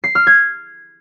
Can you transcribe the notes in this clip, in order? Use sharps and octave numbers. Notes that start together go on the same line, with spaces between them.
C7
F6
G#6